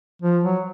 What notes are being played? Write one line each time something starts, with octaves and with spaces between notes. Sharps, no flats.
F3
F#3